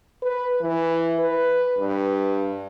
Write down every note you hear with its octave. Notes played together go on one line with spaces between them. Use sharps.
B4
E3
B4
G2